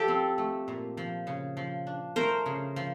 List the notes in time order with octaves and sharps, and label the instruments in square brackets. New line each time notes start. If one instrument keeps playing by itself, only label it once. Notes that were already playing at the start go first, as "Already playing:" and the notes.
Already playing: [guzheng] F3 [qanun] G4 A4
[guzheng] C4
A3
A#2
F3
C#3
F3
D4
[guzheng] A3 [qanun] A#4 C5
[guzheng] C#3
F3